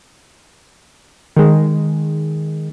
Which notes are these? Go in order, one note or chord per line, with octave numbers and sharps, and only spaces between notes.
D#3 G#3